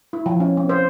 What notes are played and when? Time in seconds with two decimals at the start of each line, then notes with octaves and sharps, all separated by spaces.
0.13 E4
0.26 F3
0.40 C#4
0.57 C4
0.69 C5